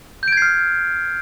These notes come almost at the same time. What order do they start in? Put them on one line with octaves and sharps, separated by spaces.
G6 D7 G#6 C7 F6